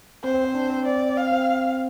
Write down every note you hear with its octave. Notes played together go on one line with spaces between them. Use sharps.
C4 C5
C4
C4
D4
C4
D5
C4 F5
C4